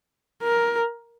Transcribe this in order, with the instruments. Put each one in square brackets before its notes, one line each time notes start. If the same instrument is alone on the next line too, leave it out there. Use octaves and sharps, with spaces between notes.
[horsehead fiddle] A#4